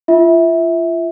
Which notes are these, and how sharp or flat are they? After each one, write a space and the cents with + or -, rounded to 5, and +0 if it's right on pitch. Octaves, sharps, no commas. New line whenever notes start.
F4 -30 E5 -15